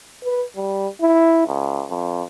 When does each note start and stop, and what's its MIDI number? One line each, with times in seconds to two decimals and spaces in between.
0.24 0.44 71
0.57 0.87 55
1.01 1.45 64
1.47 1.84 37
1.89 2.23 41